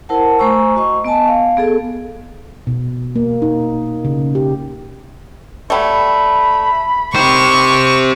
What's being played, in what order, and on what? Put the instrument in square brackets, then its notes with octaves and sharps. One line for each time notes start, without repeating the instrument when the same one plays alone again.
[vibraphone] E4 A#4 C5 F#5 A5
A3 C5 G#5 A#5 C#6 E6
F#4 D#5 C#6
B3 D#5 G#5 A5
F5
B3 G#4 A4
[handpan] B2
A#3
D#4
C#3
G4
[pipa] F#3 G3 A3 [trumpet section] B5
[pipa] D#3 [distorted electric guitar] G4 C5 [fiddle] C#6